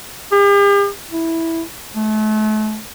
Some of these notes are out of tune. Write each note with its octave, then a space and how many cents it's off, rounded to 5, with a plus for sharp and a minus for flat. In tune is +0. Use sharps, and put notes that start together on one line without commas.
G4 +45
E4 -5
A3 -35